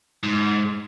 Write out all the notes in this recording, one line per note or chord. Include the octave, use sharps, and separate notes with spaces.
G#2